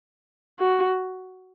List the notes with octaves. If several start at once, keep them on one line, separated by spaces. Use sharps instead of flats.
F#4